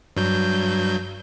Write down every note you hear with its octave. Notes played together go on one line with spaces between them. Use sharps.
G2 F#3 G6